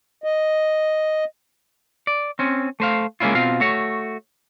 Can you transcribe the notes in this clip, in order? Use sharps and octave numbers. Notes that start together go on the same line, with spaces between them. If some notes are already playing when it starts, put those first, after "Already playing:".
D#5
D5
C4 C#4
A3 C5 F5
G#3 A#3 C4 C#4 E4 F4
B2 C4 F4 F5
A3 F#4 C#5